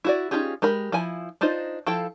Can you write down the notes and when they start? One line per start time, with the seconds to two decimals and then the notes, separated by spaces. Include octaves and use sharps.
0.04 E4 F#4 D5
0.31 C#4 D#4 F4 G4 G#4
0.62 G#3 G4 A#4 B5
0.92 F3 E4 G#5 B5
1.41 D4 D#4 F4 C5 D#5
1.87 F3 E4 A4 F5 G5